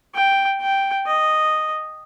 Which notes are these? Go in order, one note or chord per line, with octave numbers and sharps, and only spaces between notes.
G5
G5
D#5